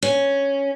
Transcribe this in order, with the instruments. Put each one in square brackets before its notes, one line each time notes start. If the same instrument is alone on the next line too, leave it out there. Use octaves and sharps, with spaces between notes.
[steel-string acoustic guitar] C#4